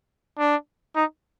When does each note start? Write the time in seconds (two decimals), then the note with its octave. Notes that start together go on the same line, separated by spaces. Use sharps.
0.39 D4
0.96 D#4